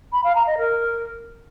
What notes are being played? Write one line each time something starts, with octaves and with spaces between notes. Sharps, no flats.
B5
F5
A#5
D#5
A#4